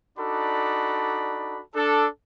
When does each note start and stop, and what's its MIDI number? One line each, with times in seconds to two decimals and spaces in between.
0.18 1.61 62
0.18 1.61 63
0.18 1.61 66
0.18 1.61 69
0.18 1.61 74
0.18 1.61 83
1.75 2.07 62
1.75 2.07 69